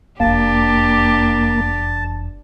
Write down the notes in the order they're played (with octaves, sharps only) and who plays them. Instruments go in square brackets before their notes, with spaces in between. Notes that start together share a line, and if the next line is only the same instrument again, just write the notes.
[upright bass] F1 E2 [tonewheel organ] A#3 [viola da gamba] D4 G4 [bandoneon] A5